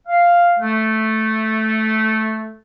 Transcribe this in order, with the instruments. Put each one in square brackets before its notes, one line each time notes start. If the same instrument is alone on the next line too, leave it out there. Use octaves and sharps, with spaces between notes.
[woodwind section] F5
A3